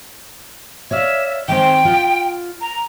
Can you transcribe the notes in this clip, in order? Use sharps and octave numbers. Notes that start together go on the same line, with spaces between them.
C#5 D5 E5 F5
D#3 G#3 C4 G5
F4 F#5
A#5